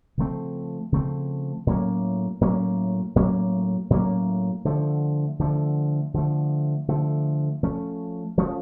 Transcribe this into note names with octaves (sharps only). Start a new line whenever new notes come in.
C#3 F3 A3 C4
C#3 F3 A3 C4
A2 F#3 A#3 C#4
A2 F#3 A#3 C#4
A2 F#3 A#3 C#4
A2 F#3 A#3 C#4
D3 F3 A3
D3 F3 A3
D3 F3 A3
D3 F3 A3
F3 A3 C#4
F3 A3 C#4